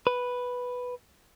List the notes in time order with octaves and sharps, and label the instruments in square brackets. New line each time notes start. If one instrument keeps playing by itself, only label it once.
[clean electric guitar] B4